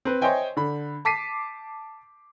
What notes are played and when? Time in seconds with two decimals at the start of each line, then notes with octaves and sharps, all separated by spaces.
0.05 C4 B4
0.21 C5 C#5 D#5 E5 G5 G#5
0.57 D3 B5
1.05 A5 D6 B6 C7 D#7